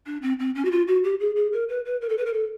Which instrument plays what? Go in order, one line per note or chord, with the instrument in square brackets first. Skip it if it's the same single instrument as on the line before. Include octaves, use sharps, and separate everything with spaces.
[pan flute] D4
C4
C4
C#4
F#4
F4
F#4
G4
G#4
G#4
A#4
B4
B4
A#4
A4
B4
A#4
A4